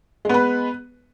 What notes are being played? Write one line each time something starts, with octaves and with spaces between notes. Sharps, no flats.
G#3 B3 B4